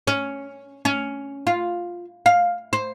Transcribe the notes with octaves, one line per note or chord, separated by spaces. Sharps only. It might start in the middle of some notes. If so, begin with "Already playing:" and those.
C#4
C#4
F4
F5
C5